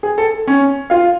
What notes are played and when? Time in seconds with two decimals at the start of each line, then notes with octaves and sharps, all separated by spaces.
0.03 G#4
0.18 A4
0.48 C#4 C#5
0.90 F4 F5